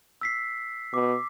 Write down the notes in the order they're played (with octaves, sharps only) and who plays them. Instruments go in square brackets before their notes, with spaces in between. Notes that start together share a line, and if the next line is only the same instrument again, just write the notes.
[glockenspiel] E6 B6 C7
[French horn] B2 [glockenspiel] D6